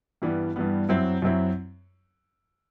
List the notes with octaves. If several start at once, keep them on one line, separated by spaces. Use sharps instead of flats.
G2 E3 G3 B3
G2 E3 G3 B3
F#2 F#3 C4 E4
F#2 F#3 C4 E4